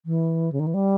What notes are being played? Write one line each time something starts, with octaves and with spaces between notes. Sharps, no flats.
E3
C#3
D#3
E3
G3